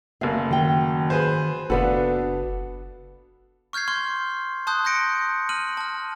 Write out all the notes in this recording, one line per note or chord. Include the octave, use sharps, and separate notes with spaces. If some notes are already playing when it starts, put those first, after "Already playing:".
F#1 A3 F5
D#3 F#4 G5
G#4 B4 C5
F#1 B3 D4 F#4 A4 B4 F5
C#6 F6 G6 G#6 C7
C6 C#6 F6
A5 C6 D#6 F#6 G6
F#6 G6 A#6 C#7 D7
F6 D#7 F#7
A5 F6